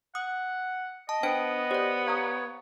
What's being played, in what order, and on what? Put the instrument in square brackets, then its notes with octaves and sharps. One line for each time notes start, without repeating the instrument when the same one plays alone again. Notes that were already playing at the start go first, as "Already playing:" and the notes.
[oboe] F#5 [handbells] D#6
[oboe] D#5 [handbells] A5
[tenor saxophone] B3 [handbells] D4 C5 D7 [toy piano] G5
[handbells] G4 D5 [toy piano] C5
[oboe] C#5 [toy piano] F5 A#5 D#6